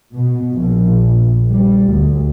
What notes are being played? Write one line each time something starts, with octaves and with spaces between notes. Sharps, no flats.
B2
A#1
G3
D2